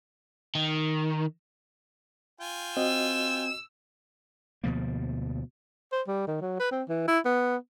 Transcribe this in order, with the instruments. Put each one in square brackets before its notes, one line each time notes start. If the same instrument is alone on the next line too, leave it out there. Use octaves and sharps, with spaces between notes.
[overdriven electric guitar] D#3
[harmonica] F4 G5 G#5
[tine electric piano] C4 [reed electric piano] F#4 D#5 [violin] E6
[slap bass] D2 B2 F3 A#3
[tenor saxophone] C5
G3
D#3
F#3
B4
C4
E3
E4
B3